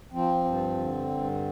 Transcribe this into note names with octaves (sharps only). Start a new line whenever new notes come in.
F3 C4
G2
D3
G2